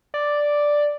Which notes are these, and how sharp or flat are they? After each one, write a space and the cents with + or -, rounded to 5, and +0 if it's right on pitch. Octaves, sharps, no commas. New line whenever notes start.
D5 +0